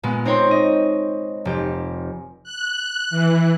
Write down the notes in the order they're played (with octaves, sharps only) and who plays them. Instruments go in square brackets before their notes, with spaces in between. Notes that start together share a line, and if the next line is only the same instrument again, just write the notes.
[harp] A#2 G#3 B3
C4 D#4 C5 C#5 G5 C6
D#5
F1 G4
[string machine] F#6
E3